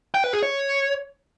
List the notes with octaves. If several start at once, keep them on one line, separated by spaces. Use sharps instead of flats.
G5
B4
G#4
C#5